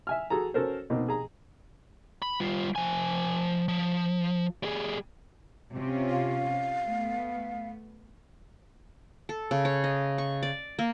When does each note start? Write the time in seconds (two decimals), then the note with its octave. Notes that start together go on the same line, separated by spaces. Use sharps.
0.07 E5 G#5 F6
0.30 F#4 G#4 A4 A#5
0.54 C#4 F#4 A4 A#4 C5
0.90 B2 A#3 C4 D#4
1.08 G#4 A#5
2.22 B5
2.40 G3 F4
2.76 F3 G#5
3.68 F3
4.63 G3 G#4
5.74 C3 C#4 F4
6.10 F5
6.87 A3 B3
9.29 A4
9.51 C#3
9.65 C#5
9.84 D#5
10.18 C#6
10.43 D5
10.79 A#3